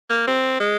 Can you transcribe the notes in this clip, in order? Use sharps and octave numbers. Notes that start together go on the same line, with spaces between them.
A#3
C4
G#3